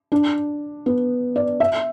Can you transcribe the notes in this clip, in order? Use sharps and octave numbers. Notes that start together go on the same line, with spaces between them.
D4
B3
D5
E5